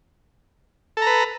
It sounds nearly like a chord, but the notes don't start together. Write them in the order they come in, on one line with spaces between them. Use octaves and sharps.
A4 A#5 B4